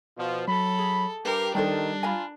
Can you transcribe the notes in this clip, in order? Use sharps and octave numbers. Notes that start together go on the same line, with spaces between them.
B2 F3
F#3 A4 B5
G#4
G2 G4 A#4 B4 C7
D#3 G3 D4 A4 C5 G5
F4 G#5 A#5 B5